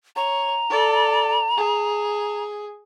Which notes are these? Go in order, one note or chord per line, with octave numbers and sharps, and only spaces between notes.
C#5 A#5
A4 D5
G#4